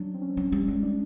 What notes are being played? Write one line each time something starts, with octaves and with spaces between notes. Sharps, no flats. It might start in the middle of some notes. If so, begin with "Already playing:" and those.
Already playing: F#3 D4
C4
C#4
C4
F#3 C#4
G3 D4
G#3 D4
D4